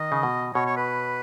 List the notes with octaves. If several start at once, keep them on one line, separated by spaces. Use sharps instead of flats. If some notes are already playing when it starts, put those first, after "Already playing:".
Already playing: D#3 D#5
C#3
B2
B2 C#5
C#5
B4